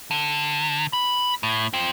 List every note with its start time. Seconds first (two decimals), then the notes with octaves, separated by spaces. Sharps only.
0.11 D3
0.93 B5
1.43 A2
1.73 C4 F4